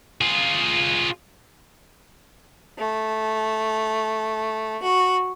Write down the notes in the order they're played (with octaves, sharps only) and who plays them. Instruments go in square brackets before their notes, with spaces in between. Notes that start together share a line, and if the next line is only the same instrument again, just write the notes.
[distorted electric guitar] F4 G#4
[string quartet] A3
F#4